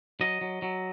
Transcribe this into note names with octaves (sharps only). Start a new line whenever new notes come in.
F#3 D#5
F#3
F#3